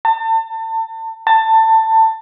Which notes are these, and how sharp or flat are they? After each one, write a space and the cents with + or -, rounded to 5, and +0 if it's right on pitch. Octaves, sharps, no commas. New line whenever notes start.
A5 +35
A5 +20